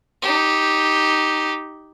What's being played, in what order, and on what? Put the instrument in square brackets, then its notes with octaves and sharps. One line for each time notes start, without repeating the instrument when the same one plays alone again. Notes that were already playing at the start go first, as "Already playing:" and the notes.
[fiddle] D#4 G4